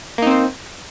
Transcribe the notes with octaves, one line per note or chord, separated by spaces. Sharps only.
A#3 C4 D#4 C5